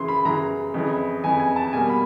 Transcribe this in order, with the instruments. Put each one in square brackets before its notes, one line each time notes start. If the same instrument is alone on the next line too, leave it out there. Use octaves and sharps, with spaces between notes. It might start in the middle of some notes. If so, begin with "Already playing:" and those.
Already playing: [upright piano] F#2 C#3 E3 C6
B5
F#2 C#3 E3 A#5
F2 C#3 E3
F2 C#3 E3 G#5
G#5
A5
B2 G3 A#3 G#5
B5